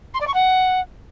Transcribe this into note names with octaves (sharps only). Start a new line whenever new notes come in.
C6
D5
C#6
F#5